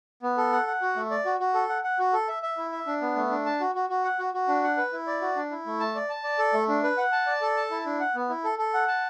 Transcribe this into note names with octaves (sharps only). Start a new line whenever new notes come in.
B3
A4
F#5
F#5
F#4
A3
D5
F#4
F#4
A4
F#5
F#5
F#4
A4
E5
E5
E4
E5
D4
B3
A3
D4
A5
F#4
F#4
F#4
F#5
F#4
F#4
D4
F#5
B4
E4
D5
F#4
D4
E4
A3
A5
D5
A5
D5
A4
A3
D4
B4
F#5
A5
D5
A4
A5
E4
D4
F#5
B3
E4
A4
A4
F#5
A5